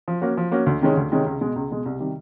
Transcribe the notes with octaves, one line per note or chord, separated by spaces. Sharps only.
F3
A#3 C#4 F#4
F3
A#3 C#4 F#4
D2
C3 D#3 G#3 C#4
D2
C3 D#3 G#3 C#4
C#2
B2 G#3
C#2
B2 G#3
C2
C3 D#3 G3